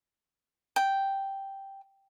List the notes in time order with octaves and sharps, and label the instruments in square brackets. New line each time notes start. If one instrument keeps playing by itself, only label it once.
[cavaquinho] G5